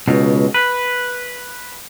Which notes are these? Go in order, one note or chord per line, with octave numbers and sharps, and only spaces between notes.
C#2 B2
B4